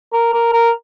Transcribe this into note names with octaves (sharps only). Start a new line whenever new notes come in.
A#4
A#4
A#4